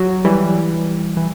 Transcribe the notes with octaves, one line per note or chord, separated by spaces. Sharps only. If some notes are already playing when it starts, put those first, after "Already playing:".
Already playing: F#3
E3 G3
E3